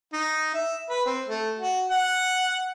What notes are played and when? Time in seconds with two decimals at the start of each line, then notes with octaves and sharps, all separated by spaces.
0.13 D#4
0.54 E5
0.90 B4
1.06 C4
1.28 A3
1.59 F#4
1.91 F#5